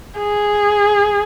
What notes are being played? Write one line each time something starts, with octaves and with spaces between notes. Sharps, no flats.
G#4